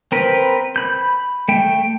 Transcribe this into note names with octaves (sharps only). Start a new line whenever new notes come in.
C4 A#4 B4
B5 G6
A3 G5